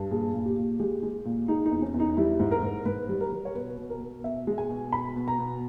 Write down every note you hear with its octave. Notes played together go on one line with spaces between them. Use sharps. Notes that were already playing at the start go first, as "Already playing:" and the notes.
Already playing: G2
A#2 G#4
A#2
G4
A#2
G#3 G4
G#3
A#2
G#3 D#4
D#4
E2
C#4
E2
D#4
G3 E4
G#2
A#4
G#2
G#2 B4
G3
A#4
G3
C#5
B2 B4
B2
A#4
B2
B2 E5
G#3
G#5
B2
B2 B5
B2
A#5
B2